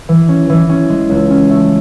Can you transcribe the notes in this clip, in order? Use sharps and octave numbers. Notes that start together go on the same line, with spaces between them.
E3
C#4
E3
C#4
G#3
C#2
C#4
A3